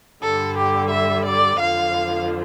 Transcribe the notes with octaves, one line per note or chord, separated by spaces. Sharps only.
G2 D3 G3 A4
G4
E5
D5
F2 D3 F3 F5